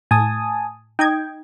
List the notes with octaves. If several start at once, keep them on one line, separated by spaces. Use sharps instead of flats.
A2 G#5 A5 D#6
D#4 D#5 G5 G#6